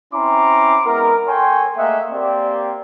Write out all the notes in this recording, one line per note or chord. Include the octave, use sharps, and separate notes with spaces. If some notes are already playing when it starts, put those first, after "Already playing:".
C4 C#4 E4 A#5 C6 D6
G#3 B3 E4 A#4
A4 C#5 G5 G#5 C6
A3 A#3 G#4 D#5 E5 F#5
A#3 C4 G4 D5